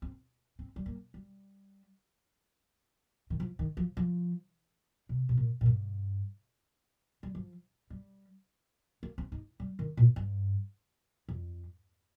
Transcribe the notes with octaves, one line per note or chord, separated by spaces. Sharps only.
C4
C4
G3
A#3
G3
D#3
F3
D#3
F3
F3
C3
C3
A#2
A#2
G2
G3
F3
G3
A#3
C4
D#4
G3
D#3
A#2
G2
F2